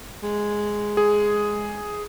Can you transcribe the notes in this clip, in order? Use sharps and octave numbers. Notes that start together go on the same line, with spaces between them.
G#3
G#4